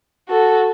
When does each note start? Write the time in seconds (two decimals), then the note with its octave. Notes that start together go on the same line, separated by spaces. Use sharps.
0.29 F#4 A4